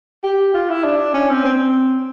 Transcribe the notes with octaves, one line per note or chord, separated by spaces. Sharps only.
G4
F4
E4
D4
C#4
C4
C4